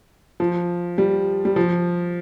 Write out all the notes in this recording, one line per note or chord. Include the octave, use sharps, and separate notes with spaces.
F3
G3
G3
F3